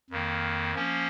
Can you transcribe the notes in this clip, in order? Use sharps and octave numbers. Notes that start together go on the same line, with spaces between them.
F2 D#3 A#3
F3 A#3 C#4